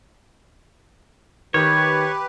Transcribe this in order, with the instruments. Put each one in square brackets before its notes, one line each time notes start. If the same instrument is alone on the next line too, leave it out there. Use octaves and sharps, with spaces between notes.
[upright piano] D#3 [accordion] G4 B4 [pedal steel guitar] C#5